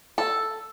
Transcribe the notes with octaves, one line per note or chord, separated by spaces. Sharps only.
A4